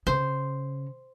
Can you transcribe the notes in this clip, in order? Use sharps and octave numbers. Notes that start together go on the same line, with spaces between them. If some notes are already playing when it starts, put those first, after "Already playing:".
C#3 C5